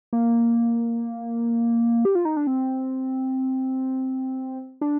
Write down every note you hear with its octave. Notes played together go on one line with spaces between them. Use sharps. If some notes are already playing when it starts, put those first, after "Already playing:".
A#3
G4
F4
D#4
D4
C4
D4